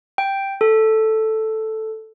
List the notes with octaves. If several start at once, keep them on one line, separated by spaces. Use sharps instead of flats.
G5
A4